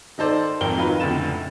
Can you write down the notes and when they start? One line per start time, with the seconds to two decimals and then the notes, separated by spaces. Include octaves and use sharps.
0.18 D#3 D#4 A4 C5 D5
0.60 G#1 F2 A#4 G5 G7
0.77 D#3 F#3 D#4 F4 B4
1.00 F1 C#2 A2 D3 A6 E7